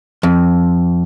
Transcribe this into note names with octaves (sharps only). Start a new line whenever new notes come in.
F2